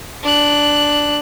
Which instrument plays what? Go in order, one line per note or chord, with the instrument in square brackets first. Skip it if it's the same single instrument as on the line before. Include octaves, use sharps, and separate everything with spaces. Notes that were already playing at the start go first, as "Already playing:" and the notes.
[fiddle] D4 F#6